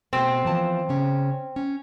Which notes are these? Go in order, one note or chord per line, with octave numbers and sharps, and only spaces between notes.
B2 A3 C4
E3 F3 A5
C#3 C#4
C#4